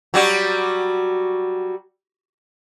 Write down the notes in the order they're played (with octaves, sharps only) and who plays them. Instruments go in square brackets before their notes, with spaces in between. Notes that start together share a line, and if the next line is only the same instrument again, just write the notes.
[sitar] F#3 G3 F#4